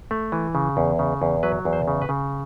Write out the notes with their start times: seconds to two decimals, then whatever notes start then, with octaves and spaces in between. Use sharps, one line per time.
0.11 A3
0.32 E3
0.55 C#3
0.77 E2
0.99 C#3
1.22 E2
1.43 F#3 B4
1.65 E2
1.73 C5
1.88 C#3
2.02 B4
2.09 C#3